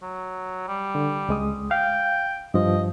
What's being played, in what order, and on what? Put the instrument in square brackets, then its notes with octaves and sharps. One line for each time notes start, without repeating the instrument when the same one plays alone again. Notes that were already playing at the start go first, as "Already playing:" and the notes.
[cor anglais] F#3
G3
[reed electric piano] D3
C#2 G#3 D#6
[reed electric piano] F5 [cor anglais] G5
[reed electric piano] G2 F3 [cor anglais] D#5